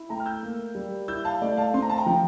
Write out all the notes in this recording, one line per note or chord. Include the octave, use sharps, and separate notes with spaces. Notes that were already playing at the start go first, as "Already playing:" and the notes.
Already playing: E4
A3 G5 A#5
F6
E6 G6
A#3
G3
E4 E6 G6
F5 A5
A3 D5 F5
F5 A5
C4 C6
A#5
A5
G5 A#5
F3